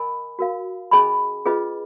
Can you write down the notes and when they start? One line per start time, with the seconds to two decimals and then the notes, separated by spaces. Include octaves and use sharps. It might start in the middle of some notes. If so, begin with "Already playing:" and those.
Already playing: A#4 D#5 G#5 B5
0.39 F#4 A#4 F5
0.91 C#4 G#4 D#5 G#5 B5
1.46 C#4 F4 G#4 B4 D#5